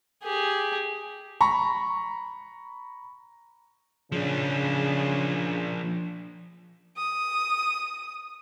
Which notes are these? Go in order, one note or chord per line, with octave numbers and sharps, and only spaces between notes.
G4 G#4
A#5 B5 C#6
C#3 F3 D4
D#6